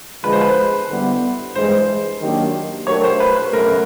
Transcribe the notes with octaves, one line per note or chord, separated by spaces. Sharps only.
D3 F3 G#3 B4
C5
B4
D3 G3 B3 E4
G2 E3 G#3 C5
D#3 F#3 A#3 D4 G4
F#3 A3 D4 G4 A#4 C#5
C5
B4
B4
F#2 C#3 F#3 A3 A#4